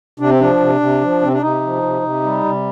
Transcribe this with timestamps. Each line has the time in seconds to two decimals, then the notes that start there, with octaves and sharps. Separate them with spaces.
0.19 C3 D4
0.30 C4
0.40 F3 D4
0.60 C3
0.80 C3
1.02 F3
1.22 C3 C4
1.32 D4
1.41 C3 D#4
1.62 F3
1.83 C3
2.02 C3
2.23 G3
2.44 C3